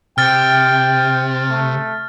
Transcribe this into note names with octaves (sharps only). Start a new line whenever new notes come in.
C3 G5 F6 A6
A3